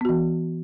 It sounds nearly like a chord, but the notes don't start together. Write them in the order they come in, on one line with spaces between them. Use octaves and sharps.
B3 F#4 E3